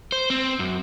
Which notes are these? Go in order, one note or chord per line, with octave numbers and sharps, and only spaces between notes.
C5
C4
F#2